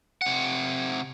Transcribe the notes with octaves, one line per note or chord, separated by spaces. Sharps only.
C3 F#5